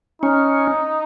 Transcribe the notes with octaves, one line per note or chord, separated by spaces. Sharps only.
C#4 D#4